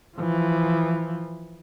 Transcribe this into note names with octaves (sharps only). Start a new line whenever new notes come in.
E3 F3